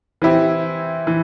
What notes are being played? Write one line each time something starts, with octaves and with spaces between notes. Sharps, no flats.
E3 C4 E4 G4
E3